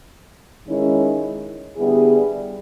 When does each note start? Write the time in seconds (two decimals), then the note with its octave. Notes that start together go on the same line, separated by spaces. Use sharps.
0.66 D#3 G#3 C#4 E4
1.77 D3 G3 B3 E4 G#4